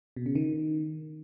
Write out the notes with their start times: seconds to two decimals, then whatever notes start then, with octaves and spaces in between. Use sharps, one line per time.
0.16 B2
0.26 C#3
0.35 D#3